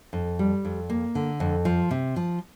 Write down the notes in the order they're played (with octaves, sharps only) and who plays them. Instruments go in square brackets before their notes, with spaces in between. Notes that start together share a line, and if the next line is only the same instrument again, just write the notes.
[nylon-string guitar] F2
G3
F2
A#3
D3
F2
F3
C3
F3